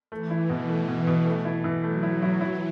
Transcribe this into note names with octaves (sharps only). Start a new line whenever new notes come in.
E3 A3
E4
B2
A3
B2
B2
A3
E4
E3
F#3 A3
E4
E4
E3 E4